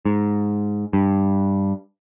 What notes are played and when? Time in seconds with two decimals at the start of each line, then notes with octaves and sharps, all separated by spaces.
0.05 G#2
0.93 G2